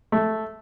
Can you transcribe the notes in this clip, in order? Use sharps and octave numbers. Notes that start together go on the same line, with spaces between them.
A3